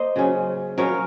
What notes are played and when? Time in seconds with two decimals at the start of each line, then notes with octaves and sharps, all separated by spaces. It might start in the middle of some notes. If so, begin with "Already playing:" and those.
Already playing: A#3 C5 D#5
0.16 C#3 F#3 C#4
0.78 C#3 F#3 C#4 A#4 C#5